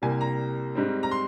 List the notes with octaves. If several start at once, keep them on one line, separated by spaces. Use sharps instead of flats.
C2 C3 G3 A#3 G#5
A#5
G#2 G3 C4
A#5
C6